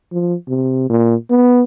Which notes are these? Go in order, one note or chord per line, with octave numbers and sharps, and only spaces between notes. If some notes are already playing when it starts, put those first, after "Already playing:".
F3
C3
A#2
B3